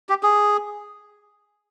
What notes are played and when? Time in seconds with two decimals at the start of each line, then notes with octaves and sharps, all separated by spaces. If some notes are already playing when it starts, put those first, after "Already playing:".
0.09 G4
0.23 G#4